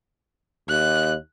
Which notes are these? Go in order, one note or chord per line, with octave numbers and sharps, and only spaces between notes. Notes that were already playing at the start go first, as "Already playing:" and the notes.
D#2 F#6